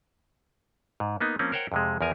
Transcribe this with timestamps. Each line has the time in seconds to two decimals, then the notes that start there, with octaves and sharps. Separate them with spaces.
1.00 G#2
1.20 A#3 B3 D#4
1.39 F3 A#3 C4 C#4
1.52 A#4 C5 C#5 F#5 G5
1.72 F2 C3 G#3
2.01 E2 F3 A#4 G#5